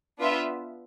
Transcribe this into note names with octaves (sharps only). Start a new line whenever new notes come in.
B3 D4 F4 B4 E5